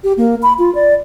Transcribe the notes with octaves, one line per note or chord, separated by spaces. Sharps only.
G4
A#3
B5
F4
D5